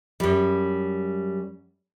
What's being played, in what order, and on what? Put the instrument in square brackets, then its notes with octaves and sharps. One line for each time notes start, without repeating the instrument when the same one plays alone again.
[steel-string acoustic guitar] F#2 G3